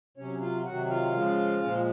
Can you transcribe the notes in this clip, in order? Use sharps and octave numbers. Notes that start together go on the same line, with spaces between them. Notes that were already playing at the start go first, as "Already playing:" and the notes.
C3 F#3 C#4 C#5
F4 F5
C3 D#3 F#3 F#4 F#5
F4 F5
C#3 F3 G#3
A#2 F3 G#3